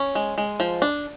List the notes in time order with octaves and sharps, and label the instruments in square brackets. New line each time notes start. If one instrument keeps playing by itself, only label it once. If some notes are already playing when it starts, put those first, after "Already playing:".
Already playing: [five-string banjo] C#4
G#3
G#3
F3
D4